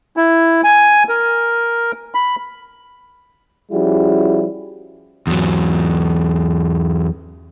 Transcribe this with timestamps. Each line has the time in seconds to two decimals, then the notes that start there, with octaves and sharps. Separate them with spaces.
0.17 E4
0.64 G#5
1.09 A#4
2.14 B5
3.72 F3 G3 C#4 E4 F#4 G#4
5.27 E2 F#3